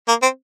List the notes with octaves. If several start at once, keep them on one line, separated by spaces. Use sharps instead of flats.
A#3
C4